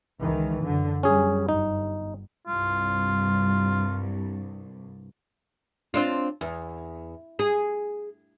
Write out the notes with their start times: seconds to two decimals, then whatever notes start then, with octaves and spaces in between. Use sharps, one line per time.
0.20 C#2 D#3 E3
0.63 F#2 D3
1.03 F#2 G3 C#4 G#4
1.49 G1 D#4
2.47 C2 G2 F4
5.94 C4 D4 F4
6.41 E2
7.39 G#4